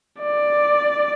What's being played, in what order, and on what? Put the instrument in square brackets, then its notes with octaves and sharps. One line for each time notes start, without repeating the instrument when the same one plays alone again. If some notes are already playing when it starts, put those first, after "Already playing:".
[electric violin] D5